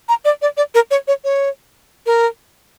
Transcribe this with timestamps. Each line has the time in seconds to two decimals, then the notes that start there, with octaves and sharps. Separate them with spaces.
0.09 A#5
0.25 D5
0.42 D5
0.57 D5
0.75 A#4
0.91 C#5
1.08 C#5
1.24 C#5
2.06 A#4